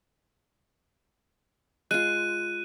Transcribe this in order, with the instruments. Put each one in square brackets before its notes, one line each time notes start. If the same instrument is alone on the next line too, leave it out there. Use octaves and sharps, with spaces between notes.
[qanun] G#3 F4 [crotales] F#6 D#7